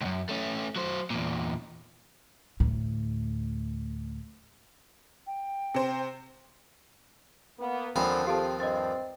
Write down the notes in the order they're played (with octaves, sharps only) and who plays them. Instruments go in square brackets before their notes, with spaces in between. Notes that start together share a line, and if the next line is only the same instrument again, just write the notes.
[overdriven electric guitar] C#2 F#2
A3 C#4
F#3 C5
E2 A#2
[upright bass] D2 A2
[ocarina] G5
[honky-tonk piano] C3 C5
[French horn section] A#3 B3
[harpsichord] D#2 F3 G#5 [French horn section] D3 [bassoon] C4 [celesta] B5
[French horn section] C4 [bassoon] F4 [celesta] G4 A4 A5
[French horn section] G2 [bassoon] C4 [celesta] D#5 A6